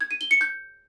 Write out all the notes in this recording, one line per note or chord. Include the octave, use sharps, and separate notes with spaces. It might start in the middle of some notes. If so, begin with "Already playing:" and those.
G#6
D#7
G7
C#7
G6